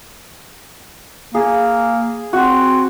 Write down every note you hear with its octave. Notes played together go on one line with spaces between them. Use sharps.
A#3 G#4
C4 F#4